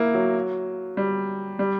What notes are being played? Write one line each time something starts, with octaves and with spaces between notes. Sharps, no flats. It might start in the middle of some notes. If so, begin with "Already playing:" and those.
Already playing: A#3 E4
F#3
G3
G3